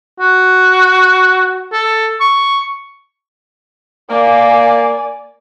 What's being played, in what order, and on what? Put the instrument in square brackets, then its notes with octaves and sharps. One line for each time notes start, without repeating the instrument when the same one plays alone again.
[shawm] F#4
A4
C#6
[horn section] A#3 [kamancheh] D5 G#5